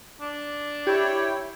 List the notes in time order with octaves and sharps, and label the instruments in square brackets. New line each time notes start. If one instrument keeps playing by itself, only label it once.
[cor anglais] D4
[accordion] E4 C#5 G5 [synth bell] G4